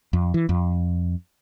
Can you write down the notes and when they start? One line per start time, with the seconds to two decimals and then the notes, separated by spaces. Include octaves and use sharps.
0.13 F2
0.34 E3
0.49 F2